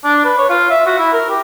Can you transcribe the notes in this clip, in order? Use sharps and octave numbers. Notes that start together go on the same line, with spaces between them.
D4
B4
C#5
F4
E5
F#4
E4
A#4
G4